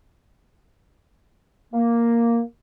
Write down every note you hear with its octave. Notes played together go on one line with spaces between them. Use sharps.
A#3